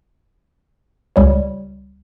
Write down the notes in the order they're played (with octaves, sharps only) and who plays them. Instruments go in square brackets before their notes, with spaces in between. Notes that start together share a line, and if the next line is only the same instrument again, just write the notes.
[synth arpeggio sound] C#2 G3 C#5